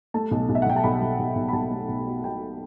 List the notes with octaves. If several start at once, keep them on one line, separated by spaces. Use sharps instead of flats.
A3 A5
B1
B1
E5
F#5
B1 G5
A5
B1 B5
B1
B1
B1
B5
B1 A5
A3
B1
B2
B2 G5